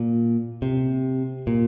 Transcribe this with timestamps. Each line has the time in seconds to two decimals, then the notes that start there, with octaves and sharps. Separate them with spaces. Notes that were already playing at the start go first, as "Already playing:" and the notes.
Already playing: A#2
0.62 C3
1.47 A#2